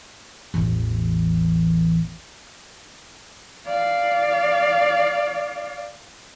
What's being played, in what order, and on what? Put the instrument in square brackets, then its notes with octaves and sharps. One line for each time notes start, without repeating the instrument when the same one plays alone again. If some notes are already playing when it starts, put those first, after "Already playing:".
[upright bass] A1 E2
[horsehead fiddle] D5 F5